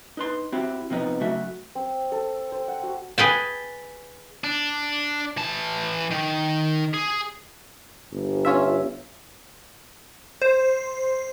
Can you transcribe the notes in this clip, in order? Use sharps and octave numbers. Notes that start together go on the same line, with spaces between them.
D#4 B4 C6
C4 E4 F#4 G4
C3 F3 B3 D#4
F#2 C#3 A3 F#4 E5
C4
A4
C5
F#5
F#4
G#4 B4 G5 A5
D4
E3 A5
D#3
G#4
G1
C#4 F4 E5
C5